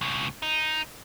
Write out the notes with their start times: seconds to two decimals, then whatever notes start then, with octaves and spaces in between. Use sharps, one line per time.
0.01 C#2 B2
0.42 D#4